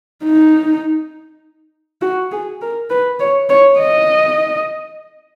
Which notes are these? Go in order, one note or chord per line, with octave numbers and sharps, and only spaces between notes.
D#4
F#4
G#4
A#4
B4
C#5
C#5
D#5